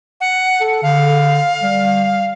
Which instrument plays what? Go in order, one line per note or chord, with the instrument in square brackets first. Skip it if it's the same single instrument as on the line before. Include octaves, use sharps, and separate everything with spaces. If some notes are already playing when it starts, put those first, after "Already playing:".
[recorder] F#5
[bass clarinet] A4
[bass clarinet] D3 [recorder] F5
[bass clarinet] G3